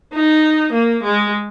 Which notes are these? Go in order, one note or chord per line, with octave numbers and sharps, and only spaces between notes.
D#4
A#3
G#3